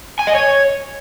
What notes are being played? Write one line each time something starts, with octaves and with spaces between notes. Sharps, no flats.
G#5
D#5
C#5